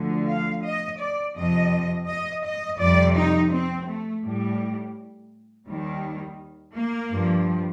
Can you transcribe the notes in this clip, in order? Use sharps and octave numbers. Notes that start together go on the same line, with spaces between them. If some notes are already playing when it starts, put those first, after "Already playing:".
Already playing: D2 D3 F3
F5
D#5
D5
F2 C3 F3 D#5
D#5
D#5
F2 C3 G3 D5
D#4
C4
A3
A2 G3
D#2 D#3 G3
A#3
G2 F3